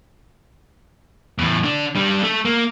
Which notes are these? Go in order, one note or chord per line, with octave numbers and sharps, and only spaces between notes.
E2 A2
D3 D4
G3 D4
A3
A#3